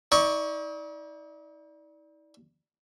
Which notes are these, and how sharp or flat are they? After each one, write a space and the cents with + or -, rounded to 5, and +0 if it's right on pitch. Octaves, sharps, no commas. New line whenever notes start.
D#4 +45 D5 +0 C#6 +0